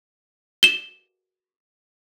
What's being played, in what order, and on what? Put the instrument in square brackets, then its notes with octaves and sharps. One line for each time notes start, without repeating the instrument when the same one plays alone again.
[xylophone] E7 G7